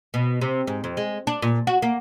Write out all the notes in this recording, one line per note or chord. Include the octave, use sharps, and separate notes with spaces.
B2
C3
G#2
F2
G#3
D4
A#2
F#4
A#3